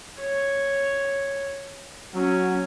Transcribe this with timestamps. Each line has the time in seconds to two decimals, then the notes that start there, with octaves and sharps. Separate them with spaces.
0.19 C#5
2.15 F#3 C#4